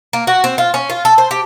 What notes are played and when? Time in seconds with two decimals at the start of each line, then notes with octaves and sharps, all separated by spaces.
0.13 A#3
0.27 F#4
0.44 C4
0.58 F4
0.74 C#4
0.90 F4
1.05 A4
1.18 C5
1.31 G4